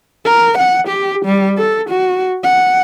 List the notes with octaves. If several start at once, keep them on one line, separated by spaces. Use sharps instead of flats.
A#4
F#5
G4
G3
A4
F#4
F#5